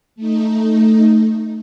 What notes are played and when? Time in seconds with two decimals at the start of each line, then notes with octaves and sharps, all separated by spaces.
0.16 A3 D#4